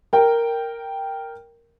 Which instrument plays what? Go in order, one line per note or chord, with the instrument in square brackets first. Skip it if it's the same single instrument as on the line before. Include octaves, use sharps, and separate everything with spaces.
[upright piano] A#4 G5